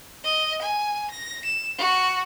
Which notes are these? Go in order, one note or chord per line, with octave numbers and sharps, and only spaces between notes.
D#5
G#5
A#6
E7
F#4